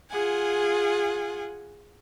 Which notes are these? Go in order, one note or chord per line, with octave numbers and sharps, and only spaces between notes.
F4 G#4 F#5 G#5